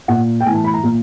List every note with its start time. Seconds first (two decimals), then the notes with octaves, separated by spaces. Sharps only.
0.08 A#2 F#5
0.40 G5
0.46 A2 G#5
0.49 E3
0.55 A5
0.64 B5
0.74 A#5
0.83 A#2